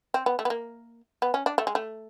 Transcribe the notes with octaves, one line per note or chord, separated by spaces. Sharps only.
C4
B3
A3
B3
A#3
B3
C#4
D4
A3
G#3
A3